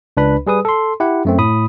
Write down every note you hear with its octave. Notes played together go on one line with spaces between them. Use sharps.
C#2 D4 B4 B5
G3 G#4 B4 D#6
A4 C6
E4 G4 F#5
F#2 A3 C4
A2 B5 D#6